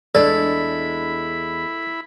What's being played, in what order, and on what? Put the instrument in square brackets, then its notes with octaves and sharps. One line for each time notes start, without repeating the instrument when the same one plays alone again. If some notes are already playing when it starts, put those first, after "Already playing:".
[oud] E2 G#3 D4 [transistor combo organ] E4 B5 [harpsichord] A4 [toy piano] D5